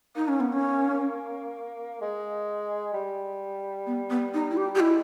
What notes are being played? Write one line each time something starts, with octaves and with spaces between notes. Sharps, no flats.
A#3 D#4
C#4
B3
C#4
G#3
G3
B3
B3
D#4
E4
G4
G4
G#3 E4